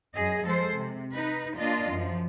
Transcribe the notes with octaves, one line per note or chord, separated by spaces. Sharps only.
F#2 G#4 D#5
F3 G#3 A4 C5
C3
D#4 B4
A#3 D4 F4 D#5
F#2 F3